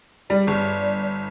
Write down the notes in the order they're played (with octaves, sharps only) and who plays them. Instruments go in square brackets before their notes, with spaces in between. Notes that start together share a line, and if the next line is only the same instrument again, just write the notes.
[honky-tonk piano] G3 [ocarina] D5
[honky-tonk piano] G1